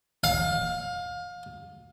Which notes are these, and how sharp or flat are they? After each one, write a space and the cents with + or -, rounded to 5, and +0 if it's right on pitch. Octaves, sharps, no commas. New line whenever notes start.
F5 +30